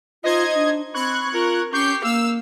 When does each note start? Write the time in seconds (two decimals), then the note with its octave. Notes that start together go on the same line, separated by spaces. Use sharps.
0.24 D#4 F4 C5 D#5 G#6
0.55 D4
0.94 C4 B5 C#6 F#6 G#6
1.34 F4 A#4
1.73 C#4 G4 C#6 G6 C7
2.04 A#3 F5 E6